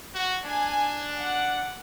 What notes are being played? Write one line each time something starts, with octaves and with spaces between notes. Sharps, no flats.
F#4
D4 G#5
F#5 D6